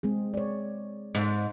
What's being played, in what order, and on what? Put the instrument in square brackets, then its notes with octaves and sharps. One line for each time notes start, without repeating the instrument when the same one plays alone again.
[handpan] G#3 C4 G#4
C#5 D5
[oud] G#2